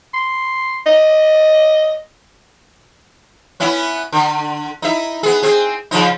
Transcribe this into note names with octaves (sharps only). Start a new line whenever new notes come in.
C6
D#5
B3 C#4 E4
D3
D#4 E4 E5
B3 G#4
C4 G#4
C#3 F3 D#4